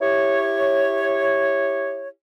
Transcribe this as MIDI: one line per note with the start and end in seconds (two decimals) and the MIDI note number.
0.01 2.09 64
0.01 2.09 67
0.01 2.09 73